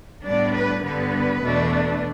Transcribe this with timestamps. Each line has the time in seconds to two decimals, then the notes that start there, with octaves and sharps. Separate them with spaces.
0.25 A2 G3 B3 D4 D5
0.54 B4
0.83 G2 D3 G3 B3 B4
1.42 E2 B2 A3 D4